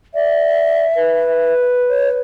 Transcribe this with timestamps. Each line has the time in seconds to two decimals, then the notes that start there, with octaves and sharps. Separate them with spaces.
0.14 D5 E5
0.96 B4
1.90 C#5